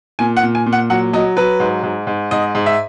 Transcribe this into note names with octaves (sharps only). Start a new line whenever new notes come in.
A#2 G#5
F#5
A#2
G#5
A#2
F#5
F#3 F#5
F#3 D#5
F#3 B4
G#2
G#2
G#2
G#2 D#5
G#2
E5